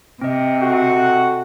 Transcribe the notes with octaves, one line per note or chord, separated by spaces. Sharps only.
C3 C4 D#5
F#4 A4 F#5